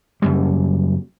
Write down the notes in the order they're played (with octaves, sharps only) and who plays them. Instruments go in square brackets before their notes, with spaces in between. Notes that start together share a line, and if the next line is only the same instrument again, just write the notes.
[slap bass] F#1 F#2 G3